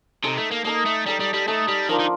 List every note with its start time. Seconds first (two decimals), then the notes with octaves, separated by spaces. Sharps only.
0.24 C3 D#4 A4 D#5
0.38 A3
0.52 A#3
0.65 A#3 D#4 A4 D#5
0.86 A3
1.06 G3 D#4 A4 D#5
1.20 G3
1.34 G3
1.47 A3 D#4 A4 D#5
1.68 G3
1.89 D#3 F3 A#3 D4 F4
2.00 D#3